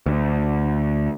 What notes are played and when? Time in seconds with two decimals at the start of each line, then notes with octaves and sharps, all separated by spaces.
0.06 D2